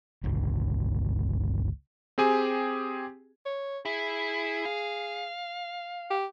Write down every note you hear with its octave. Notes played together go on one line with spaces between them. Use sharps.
G1 C#2
C4 G4 G#4 G#5
C#5
E4 G#4
F5
G4